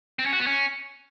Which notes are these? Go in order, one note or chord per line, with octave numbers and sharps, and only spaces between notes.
C4
C#4
F#4
B3
C#4